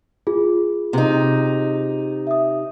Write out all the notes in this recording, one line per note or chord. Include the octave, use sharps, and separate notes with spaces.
F4 G#4
C3 D#4
E5 D#6